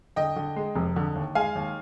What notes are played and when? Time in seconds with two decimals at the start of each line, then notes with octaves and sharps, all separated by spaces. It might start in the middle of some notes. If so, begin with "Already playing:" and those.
0.16 D3 D#5 G5
0.36 D3
0.56 G#3
0.75 F1
0.96 D3
1.15 D#2
1.35 G#3 F5 G#5
1.55 D#2